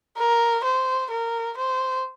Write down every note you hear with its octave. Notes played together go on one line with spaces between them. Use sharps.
A#4
C5
A#4
C5